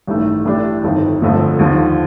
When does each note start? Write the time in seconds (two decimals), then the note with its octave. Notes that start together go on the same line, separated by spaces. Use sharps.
0.07 A1 G2 D#3 A3
0.45 A1 A2 A3 D4 G4
0.83 G1 F2 D#3
1.22 G1 F2 D3 F3 A3
1.59 D#2 D3 F3